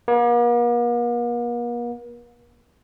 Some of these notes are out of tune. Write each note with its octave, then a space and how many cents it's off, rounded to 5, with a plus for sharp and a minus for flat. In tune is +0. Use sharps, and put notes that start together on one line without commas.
A#3 +45